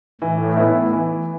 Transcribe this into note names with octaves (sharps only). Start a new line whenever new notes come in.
A2 E3
B3 E4
E3